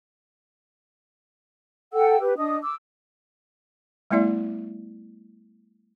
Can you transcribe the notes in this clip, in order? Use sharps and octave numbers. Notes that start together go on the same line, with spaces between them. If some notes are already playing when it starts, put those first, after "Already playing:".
A4 F#5 G5 E6
G4 B4
D4 D#5 D#6
D6 E6
G3 A3 B3 E4 D5 E5